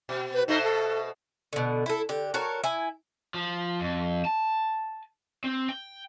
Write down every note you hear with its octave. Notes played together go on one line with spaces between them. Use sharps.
B2
B4
B2 A3 D#4 C5
A4
B2 D3
E4 A4
D3 G4
F#4 A4 A#4 C#5
E4 G#5
F3
F2
A5
C4
G5